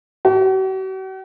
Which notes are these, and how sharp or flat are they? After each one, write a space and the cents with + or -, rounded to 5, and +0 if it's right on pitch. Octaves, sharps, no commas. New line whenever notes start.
F#4 +45